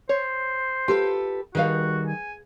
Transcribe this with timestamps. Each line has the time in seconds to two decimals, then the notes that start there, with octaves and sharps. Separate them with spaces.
0.09 C5 C#5
0.88 F4 G4 A4 B4
1.55 D#3 G3 F#4 G#4 B4 F5
2.07 G#5